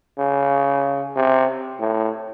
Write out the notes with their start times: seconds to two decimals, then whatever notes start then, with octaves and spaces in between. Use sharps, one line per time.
0.19 C#3
1.16 C3
1.80 A2